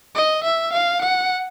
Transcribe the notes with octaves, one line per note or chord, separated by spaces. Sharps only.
D#5
E5
F5
F#5